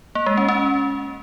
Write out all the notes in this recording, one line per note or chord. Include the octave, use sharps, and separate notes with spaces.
A#3
G#3
C#4
C#4